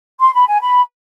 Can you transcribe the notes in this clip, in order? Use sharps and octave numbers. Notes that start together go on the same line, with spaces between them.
C6
B5
G#5
B5